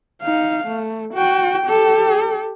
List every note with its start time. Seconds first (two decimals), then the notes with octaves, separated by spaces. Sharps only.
0.22 D#4 F5
0.68 A3
1.14 F#4 G5
1.66 G4 A4